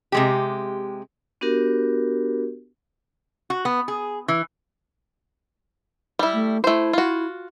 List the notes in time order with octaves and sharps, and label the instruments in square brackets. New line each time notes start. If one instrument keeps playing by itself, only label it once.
[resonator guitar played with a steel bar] C3 G#3 G4
[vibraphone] B3 D4 F#4 G4 A#4
[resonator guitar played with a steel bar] F#4
B3
G#4
E3
[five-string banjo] G3 E4
[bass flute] A3
[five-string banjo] A3 C5 [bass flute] E4
[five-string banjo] F4 F#4